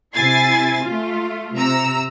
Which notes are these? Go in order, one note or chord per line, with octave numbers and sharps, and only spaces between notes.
C3 E4 G#5 A6 C7
A3 F4
C3 A#5 E6